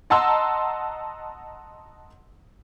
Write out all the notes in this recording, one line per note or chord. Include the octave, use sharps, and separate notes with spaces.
D#5 F#5 A5 A#5 C6 E6